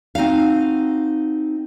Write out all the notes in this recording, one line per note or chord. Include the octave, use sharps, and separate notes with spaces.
C4 D#4 F#4 F5